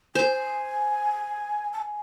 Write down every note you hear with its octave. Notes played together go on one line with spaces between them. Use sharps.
C5 G#5
A5
G#5